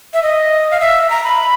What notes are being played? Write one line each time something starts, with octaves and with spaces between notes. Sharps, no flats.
E5
D#5
F5
E5
A#5
B5